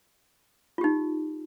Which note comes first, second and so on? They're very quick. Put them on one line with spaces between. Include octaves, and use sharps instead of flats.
F4 G4 D#4